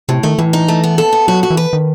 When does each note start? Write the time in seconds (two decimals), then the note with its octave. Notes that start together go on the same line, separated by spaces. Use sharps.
0.09 A2 C3
0.23 D#3 A3
0.38 A2 E3
0.53 D#4
0.68 A3
0.84 B3
0.98 A4
1.13 B3
1.28 F#3 F#4
1.43 F#4
1.50 E3
1.57 B4
1.73 D#3